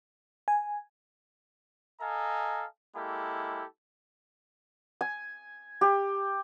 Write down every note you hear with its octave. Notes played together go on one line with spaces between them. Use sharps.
G#5
A4 D#5 F5 G#5 A#5
G#3 A#3 E4 G4 A4
G#5
G4